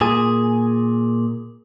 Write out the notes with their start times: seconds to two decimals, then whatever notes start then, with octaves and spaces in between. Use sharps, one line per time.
0.01 A#2 G#4